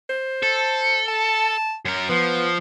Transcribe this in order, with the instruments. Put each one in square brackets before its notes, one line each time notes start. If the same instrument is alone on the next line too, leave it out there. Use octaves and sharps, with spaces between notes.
[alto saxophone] C5
[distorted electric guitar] A4
[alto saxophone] A5
[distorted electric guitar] F#2 A#4
[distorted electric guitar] F3 [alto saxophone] B3